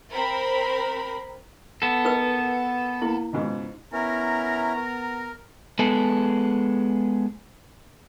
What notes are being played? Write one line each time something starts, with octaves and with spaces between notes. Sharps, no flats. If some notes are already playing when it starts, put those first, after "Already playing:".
C4 A#4 C5 B5
B3 A4
D#4 A#4 B4 E6
A#3 E4
C#2 G#2 B2
B3 C#4 E4 A#4 A#5
A#4
G#3 B3 G#4 A4